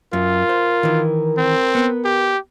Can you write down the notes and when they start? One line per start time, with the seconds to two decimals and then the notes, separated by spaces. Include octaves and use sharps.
0.13 F#2 F4 A#4
0.49 C5
0.83 D#3 E3
1.37 C4
1.75 B3
2.05 G4